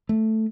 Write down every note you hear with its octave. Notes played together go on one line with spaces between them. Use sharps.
A3